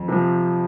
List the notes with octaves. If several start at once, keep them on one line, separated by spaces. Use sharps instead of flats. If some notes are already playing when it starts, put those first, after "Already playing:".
Already playing: F2
C3 F3